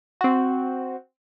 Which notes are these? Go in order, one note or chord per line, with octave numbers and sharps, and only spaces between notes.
C4 F#4